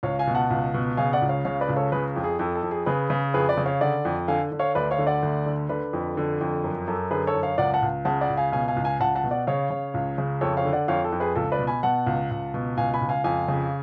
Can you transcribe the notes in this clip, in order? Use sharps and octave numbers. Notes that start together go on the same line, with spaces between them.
C#2 C#5 F5
F5 G#5
B2
F#5 A5
C#2
B2
C#3 F5 G#5
D5 F#5
C#2
C#5 F5
C#3 C#5 F5
B4 D5
C#2
A4 C#5
C#3 G#4 B4
F2
G#4
F2 A4
A4
F2
G#4
C#3 G#4 B4
C#3
F2 G#4 B4
B4 D5
C#3
C#5 F5
D3 D5 F#5
F2
D3 F5 G#5
D3
C#5 F5
D2 B4 D5
C#5 F5
D3
D5 F#5
D2
D3
D3 B4 D5
F2
D3
F2
F#2
F#2 A4
D3 G#4 B4
A4 C#5
F#2
C#5 F5
C#2 D5 F#5
F#5 A5
C#2
C#3 F#5 A5
D5 F#5
C#2
F5 G#5
B2 F5 G#5
F5 G#5
C#2
F5 G#5
C#2 F#5 A5
F#5 A5
B2
D5 F#5
C#3 C#5 F5
C#3
C#2
C#3
F2 A4 C#5
C#5 F5
D3
D5 F#5
F2 C#5 F5
A4
F2
G#4 B4
C#2 A4
B4 D5
B2
G#5 B5
B2 F#5 A5
C#2
C#2
B2
C#2 F5 G#5
G#5 B5
C#2
F5 G#5
F2 F5 G#5
C#3